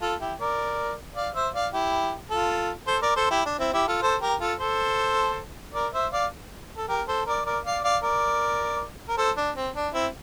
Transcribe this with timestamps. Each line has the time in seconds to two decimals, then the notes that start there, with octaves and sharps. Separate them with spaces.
0.02 F4 A4
0.21 E4 G4
0.40 A#4 D5
1.16 D5 F5
1.35 C5 E5
1.54 D5 F5
1.73 E4 G4
2.31 F4 A4
2.87 A4 C5
3.02 A#4 D5
3.16 A4 C5
3.31 E4 G4
3.46 D4
3.59 C4 E4
3.74 E4 G4
3.88 F4 A4
4.02 A4 C5
4.22 G4 A#4
4.40 F4 A4
4.60 A4 C5
5.74 A#4 D5
5.93 C5 E5
6.13 D5 F5
6.78 A4
6.88 G4 A#4
7.08 A4 C5
7.26 A#4 D5
7.46 A#4 D5
7.65 D5 F5
7.84 D5 F5
8.03 A#4 D5
9.09 A#4
9.18 A4 C5
9.37 D4
9.56 C4
9.76 D4
9.94 C4 E4